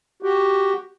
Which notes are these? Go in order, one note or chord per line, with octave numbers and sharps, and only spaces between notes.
F#4 G4